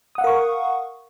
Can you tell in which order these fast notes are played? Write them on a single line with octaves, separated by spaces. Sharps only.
D#6 F#5 F5 A#4 C#6